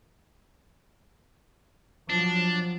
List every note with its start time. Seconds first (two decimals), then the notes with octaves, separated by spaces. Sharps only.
2.10 F3 F#3 D4